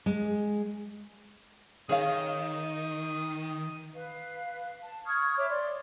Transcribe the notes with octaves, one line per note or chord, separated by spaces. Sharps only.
G#3
D#3 G#4 C#5 F5 D#6
B4 F5
A5
C#6 D#6 F6 G#6
C#5 E5 B5 D6
D5 C6